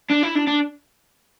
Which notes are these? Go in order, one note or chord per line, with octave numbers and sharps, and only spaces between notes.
D4
E4
D4
D4